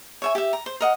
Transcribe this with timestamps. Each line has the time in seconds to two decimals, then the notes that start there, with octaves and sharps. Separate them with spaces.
0.22 C#5 E5 G#5
0.35 G4 E5
0.53 A#5
0.66 C5
0.81 A#4 D#5 F#5